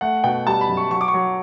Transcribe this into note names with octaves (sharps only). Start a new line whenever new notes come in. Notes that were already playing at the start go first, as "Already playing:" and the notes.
A3 F#5
B2 G5
G3 A5
B5
F#2
C#6
F#3 C#6
D6
C#6
F#3